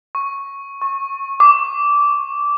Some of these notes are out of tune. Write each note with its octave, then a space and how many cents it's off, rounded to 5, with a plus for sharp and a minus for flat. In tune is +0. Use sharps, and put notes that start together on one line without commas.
C#6 -5
C#6 -20
D6 -15